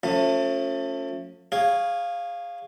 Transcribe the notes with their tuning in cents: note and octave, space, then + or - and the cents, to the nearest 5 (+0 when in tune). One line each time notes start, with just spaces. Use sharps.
F3 +40 A3 +25 C#4 +0
G#4 -25 C#5 +0 F5 +0